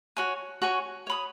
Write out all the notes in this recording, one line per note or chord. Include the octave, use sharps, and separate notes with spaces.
F#4 C#5 G#5
F#4 C#5 G#5
C#5 B5 D#6